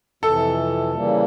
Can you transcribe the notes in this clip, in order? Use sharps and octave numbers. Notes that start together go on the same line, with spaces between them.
F2 C3 E3 A4
C#3 E3 G3 A#3